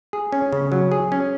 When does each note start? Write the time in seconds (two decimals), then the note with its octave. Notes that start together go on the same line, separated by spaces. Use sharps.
0.13 G#4
0.32 C#4
0.52 C#3
0.72 F#3
0.92 G#4
1.12 C#4